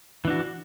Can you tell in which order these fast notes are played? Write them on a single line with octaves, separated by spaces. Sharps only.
E3 D4 F#4